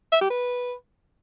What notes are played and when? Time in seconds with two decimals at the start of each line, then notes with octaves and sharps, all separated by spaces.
0.12 E5
0.21 G4
0.30 B4